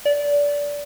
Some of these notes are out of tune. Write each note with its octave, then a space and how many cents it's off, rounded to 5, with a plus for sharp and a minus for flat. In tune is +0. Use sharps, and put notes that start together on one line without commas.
D5 -20